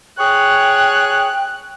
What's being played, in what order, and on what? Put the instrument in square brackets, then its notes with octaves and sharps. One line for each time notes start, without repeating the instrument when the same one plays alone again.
[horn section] G#4 C#5 [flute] G5 [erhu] F#6